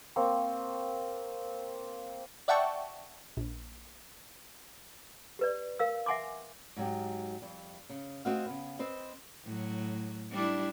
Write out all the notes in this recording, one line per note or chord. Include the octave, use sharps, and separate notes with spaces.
A#3 C4 C#6
D5 E5 F#5 G5 A5 C#6
A#1
G4 B4 D5
A#4 F5 E6
E5 F#5 G#5 C6 D6
G#2 F#3 G4
F2 G3
C#3
A3 C4 F4 F#4 D#5 F5
C#3 B3
C4 B4 C5 D#5
A2 F#3
G3 D4 E4